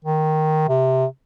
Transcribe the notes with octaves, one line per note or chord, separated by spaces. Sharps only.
D#3
C3